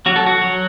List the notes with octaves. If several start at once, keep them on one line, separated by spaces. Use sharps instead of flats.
F#3 F#4
A4
F#4
F#3